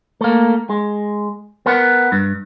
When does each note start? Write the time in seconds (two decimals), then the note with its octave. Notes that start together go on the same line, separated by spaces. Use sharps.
0.21 A3 A#3
0.70 G#3
1.66 B3 A#4 F#5
2.12 G2